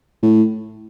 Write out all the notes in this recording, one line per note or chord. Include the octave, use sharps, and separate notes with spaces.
A2